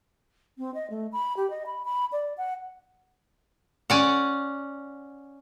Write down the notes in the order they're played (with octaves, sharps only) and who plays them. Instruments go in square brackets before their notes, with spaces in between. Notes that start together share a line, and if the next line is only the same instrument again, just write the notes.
[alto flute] C4
D#5
A3
B5
G4
D#5
B5
B5
D5
F#5
[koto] C#4 D5 F#5